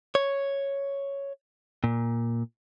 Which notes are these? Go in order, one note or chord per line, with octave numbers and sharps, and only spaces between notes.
C#5
A#2